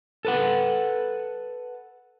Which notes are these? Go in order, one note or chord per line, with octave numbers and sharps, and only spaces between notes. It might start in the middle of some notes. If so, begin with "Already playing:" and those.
A4 B4 F#5